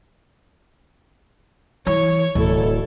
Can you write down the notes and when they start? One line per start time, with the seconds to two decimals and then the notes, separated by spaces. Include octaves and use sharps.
1.87 E3 C#5
2.35 D1 E4 A4